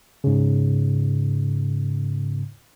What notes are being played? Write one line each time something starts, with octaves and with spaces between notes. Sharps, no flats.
G#2 C#3